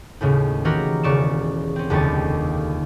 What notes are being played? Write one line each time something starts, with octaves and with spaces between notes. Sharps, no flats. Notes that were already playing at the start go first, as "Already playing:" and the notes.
D#2 A2 C#3
D#3 E3 F#4 G4 A#4
E1 C#3 D5 C#6 E7
C4 C#4
F1 D#2 D3 G3 C#6 A6